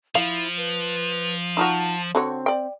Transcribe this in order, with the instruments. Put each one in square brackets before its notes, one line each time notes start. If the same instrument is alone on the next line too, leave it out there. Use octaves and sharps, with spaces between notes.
[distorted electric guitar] F3 [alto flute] E4 [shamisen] F5
[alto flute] B4
[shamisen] D#4 F4 F#4 [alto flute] A5
[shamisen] D3 F#4 C#5 [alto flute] C4
[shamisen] D5 G5